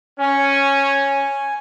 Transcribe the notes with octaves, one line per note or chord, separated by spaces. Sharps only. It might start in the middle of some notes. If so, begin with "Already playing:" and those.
C#4 G#5